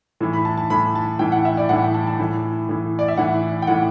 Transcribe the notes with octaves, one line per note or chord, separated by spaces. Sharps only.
A2 E3
B5
A5
A5
A2 E3 B5
A5
A2 E3 G5
F#5
E5
D5
A2 E3 F#5
G5
A5
A5
A2 E3
A2 E3
D5
E5
A2 E3 F#5
G5
A2 E3 F#5